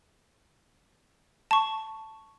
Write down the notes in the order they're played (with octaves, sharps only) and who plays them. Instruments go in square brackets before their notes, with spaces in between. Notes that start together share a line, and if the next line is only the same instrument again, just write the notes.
[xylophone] A5 C#6